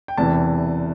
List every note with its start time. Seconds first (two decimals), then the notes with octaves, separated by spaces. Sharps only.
0.08 G5
0.17 E1 E2 C3 E3 A5